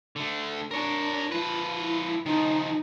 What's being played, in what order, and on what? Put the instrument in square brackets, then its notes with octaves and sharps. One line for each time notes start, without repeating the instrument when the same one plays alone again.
[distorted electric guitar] D3 A3
[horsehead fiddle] D4 [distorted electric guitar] A#4 C#5
[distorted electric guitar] F3 B4 [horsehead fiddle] F4
[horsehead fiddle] E4
[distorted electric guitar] D#3 F3 [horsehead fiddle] D#4